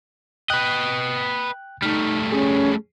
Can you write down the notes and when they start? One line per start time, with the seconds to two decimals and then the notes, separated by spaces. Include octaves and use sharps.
0.50 B4 D#5 G5 F#6
1.82 G3 A3 D#4 F6
2.32 C#4 G#4